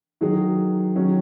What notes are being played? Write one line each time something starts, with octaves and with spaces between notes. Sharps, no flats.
D#3 F#3 D#4 G#4
D#3 F#3 C#4